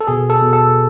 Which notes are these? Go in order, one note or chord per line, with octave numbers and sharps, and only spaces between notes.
A4
B2 G#4
A4
B2
A4